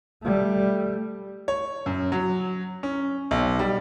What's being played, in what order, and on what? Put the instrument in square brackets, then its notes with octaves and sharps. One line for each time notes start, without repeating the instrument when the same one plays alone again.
[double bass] G3 A3
[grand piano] C#5
F#2
F#3
C#4
B1
G3